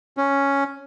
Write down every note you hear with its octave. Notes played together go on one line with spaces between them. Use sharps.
C#4